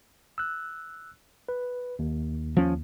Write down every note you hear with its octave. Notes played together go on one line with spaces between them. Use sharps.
E6 F#6
B4
D#2
F3 C#4